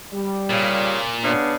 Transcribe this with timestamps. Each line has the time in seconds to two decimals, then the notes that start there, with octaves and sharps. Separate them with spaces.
0.13 G3
0.51 A#2 C#3
1.24 C#3 B3 D4 B4